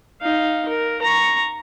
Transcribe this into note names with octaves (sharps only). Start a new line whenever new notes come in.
D#4 F5
A#4
A#5 C#6